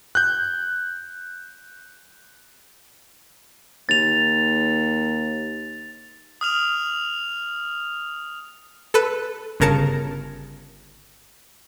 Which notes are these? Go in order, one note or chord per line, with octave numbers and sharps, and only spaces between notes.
F#6 G6
D#2 A6 F7
D#6 F6 F7
A4 B4
G1 C#3 A#4 A5 C#7